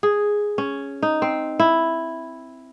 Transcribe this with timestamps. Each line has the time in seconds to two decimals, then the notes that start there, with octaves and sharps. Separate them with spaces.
0.03 G#4
0.58 C#4
1.02 D#4
1.22 C4
1.59 E4